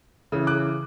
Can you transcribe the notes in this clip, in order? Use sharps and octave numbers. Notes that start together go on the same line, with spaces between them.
C#3 E3
D6 F#6